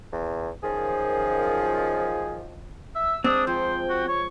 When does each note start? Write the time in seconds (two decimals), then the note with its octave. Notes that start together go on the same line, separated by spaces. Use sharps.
0.13 E2
0.63 F#2 D#3 F3 G#4
2.95 E5 E6
3.24 G#3 C4 D4 D#6
3.47 F3 C5 G5
3.90 F#4
4.08 C#5 C#6